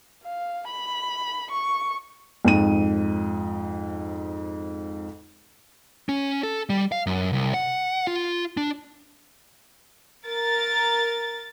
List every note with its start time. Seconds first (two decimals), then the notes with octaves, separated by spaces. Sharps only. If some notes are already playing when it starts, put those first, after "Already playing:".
0.24 F5
0.67 B5
1.51 C#6
2.45 F2 G#2 D#7
6.09 C#4
6.43 A4
6.70 G3
6.92 F5
7.07 F#2
7.33 C2
7.54 F#5
8.07 F4
8.57 D4
10.26 A#4 A6